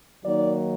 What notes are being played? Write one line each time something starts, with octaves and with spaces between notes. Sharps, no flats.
D#3 F#3 A#3 D#4 D5